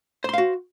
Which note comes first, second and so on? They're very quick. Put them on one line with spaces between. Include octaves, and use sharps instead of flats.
C5 C6 F5 F#4